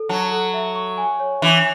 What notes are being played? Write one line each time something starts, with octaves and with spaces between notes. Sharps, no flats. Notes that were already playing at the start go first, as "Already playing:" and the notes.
Already playing: A4
F#3 A5
A4
E5
C#6
G#5
C#5
E3 E5